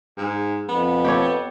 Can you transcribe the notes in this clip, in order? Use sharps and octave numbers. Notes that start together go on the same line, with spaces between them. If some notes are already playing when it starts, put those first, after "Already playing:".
G#2
F2 B3
G4 A4 C#5